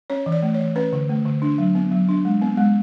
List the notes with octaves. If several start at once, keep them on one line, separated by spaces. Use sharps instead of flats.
C#4 C#5
E3
D5
A3
C#5
E3
C#4 B4
D3
A3
D3
D4
F#3
B3
F#3
D4
G#3
B3
G#3